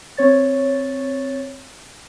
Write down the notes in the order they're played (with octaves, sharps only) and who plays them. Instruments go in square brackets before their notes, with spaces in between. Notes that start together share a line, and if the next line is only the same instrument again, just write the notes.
[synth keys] C4 C#5 A6